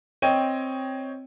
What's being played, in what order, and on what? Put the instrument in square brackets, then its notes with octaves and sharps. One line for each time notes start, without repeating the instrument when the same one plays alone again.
[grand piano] C4 C#5 D#5 G5 D#7